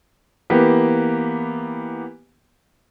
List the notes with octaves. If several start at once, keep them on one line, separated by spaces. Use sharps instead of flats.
E3 A#3 B3 G4